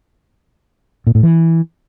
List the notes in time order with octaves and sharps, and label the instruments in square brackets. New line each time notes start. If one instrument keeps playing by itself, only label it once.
[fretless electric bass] A#2
A2
E3